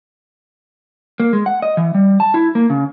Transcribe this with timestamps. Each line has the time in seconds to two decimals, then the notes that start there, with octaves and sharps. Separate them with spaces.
1.20 A#3
1.33 G#3
1.46 F#5
1.62 D#5
1.77 E3
1.94 G3
2.20 A5
2.34 E4
2.55 A#3
2.70 C#3